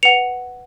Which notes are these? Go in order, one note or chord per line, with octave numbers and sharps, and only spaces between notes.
B4 F#5 C#7 F7